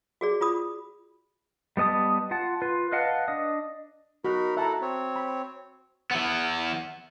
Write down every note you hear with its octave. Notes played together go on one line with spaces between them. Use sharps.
F#4 G#4 D5
F4 B5 D#6
G3 B3 D#5 A5 D#6
F4 F#5 A5
F4 B4
B4 D#5 F5 F#5 A5
D4 D#5
D#4 F#4 A#4 B5
E4 A4 E5 F#5 A5 A#5
C4 C#5
B5
E3 B3